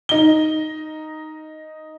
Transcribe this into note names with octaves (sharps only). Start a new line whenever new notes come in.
D#4 G7